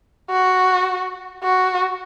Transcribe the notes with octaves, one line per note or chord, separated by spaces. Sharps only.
F#4
F#4